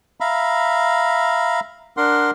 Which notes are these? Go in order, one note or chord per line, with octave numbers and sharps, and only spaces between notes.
E5 F5 A#5 B5
D4 A#4 F#5 C6